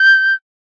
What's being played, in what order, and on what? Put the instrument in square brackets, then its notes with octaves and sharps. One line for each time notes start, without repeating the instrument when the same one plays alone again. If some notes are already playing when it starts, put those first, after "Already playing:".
Already playing: [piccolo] G6